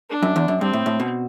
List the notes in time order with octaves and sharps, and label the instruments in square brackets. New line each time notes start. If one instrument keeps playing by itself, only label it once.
[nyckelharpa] D4
[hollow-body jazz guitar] F#2
E2
F#2
[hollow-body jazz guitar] G2 [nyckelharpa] C4
[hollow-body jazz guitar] A2
A2
B2